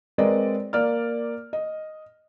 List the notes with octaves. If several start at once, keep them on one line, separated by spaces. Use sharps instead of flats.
G#3 C4 A#4 B4 D5 D#5
A#3 D5 F6
D#5